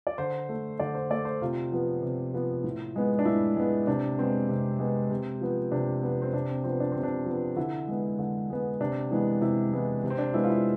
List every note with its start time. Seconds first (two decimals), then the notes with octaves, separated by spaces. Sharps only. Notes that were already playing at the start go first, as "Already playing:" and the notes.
0.07 D5
0.18 D3 C5
0.49 A3
0.79 D3 D5
0.95 C5
1.10 A3 D5
1.25 C5
1.41 C3 F4
1.72 F3 B3
2.02 C3
2.34 F3 B3
2.64 A2
2.96 G#3 B3
3.19 D4
3.25 A2 E4
3.56 G#3 B3
3.87 C3 D4
4.19 G#3 B3 C4
4.49 C3
4.80 G#3 B3
5.11 C3
5.41 F3 B3
5.72 C3 D4
6.03 F3 B3
6.22 C4
6.33 C3 D4
6.49 C4
6.64 F3 B3 C4
6.80 D4
6.92 C3 C4
7.03 D4
7.26 F3 B3
7.56 D3 E4
7.88 G#3 B3
8.19 D3
8.50 G#3 B3
8.81 C3 D4
9.11 E3 G#3 B3
9.41 C3 E4
9.72 E3 G#3 B3
10.04 C3
10.10 C4
10.18 D4
10.34 G#3 B3 E4
10.44 F4
10.50 E4